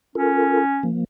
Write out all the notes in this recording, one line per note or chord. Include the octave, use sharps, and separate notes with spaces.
C#4 F4 A4 A#4
F3 A#3